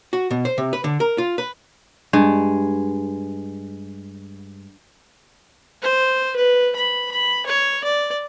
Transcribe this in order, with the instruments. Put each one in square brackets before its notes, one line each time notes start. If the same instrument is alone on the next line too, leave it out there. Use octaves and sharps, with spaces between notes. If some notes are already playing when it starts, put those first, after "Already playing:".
[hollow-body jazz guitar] F#4
B2
C5
C3
B4
D3
A#4
F4
B4
[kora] G2 G#3
[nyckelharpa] C5
B4
B5
B5
C#5
D5